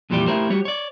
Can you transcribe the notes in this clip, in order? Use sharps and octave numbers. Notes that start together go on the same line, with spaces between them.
F2 A#2 E3 G3 G4 D5
A3 E4 G4 A#4 C5
G3 F#4 G4 C#5
C#5 D5